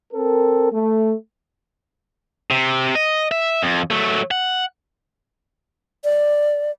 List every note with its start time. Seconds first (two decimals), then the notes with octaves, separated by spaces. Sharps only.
0.13 C4 A4 A#4
0.72 A3
2.51 C3
2.95 D#5
3.31 E5
3.63 F2
3.91 F#3 A3
4.31 F#5
6.04 D5